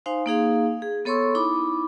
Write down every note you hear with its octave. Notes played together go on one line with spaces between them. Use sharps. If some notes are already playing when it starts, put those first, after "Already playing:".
D#4 C5 F5 G#5 C6
A#3 D#4 G#4 F5
G#4
B3 A4 C#5 C6 C#6 E6
D#4 E4 B5 D6